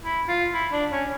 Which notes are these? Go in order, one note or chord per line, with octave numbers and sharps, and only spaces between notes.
E4
F4
E4
D4
C#4